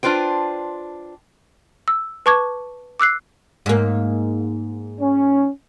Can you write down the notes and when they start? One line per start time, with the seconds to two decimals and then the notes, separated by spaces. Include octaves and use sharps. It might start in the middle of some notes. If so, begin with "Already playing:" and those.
0.03 D4 F4 B4 C5 G5
1.88 E6
2.26 B4 A5 C#6 D6 G#6
3.00 D6 E6 F#6 C7
3.66 G#2 A#3
5.00 C#4